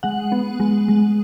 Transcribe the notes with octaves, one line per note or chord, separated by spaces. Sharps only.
G#3 F#5
B3
G#3
G#3